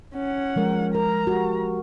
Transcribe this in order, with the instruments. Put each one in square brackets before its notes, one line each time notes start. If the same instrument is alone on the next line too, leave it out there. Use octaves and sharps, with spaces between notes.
[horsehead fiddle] C#4 F#5
[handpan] F3 G#3 A#4
[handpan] A#4 [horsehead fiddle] A#5
[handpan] F#4 G4